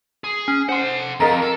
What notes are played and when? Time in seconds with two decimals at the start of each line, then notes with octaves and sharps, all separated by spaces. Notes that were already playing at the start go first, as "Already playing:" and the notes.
0.24 G#4
0.48 C#4
0.69 C5 F#5 C6
1.20 F2 A#4 D#5 A#5 A6
1.42 A4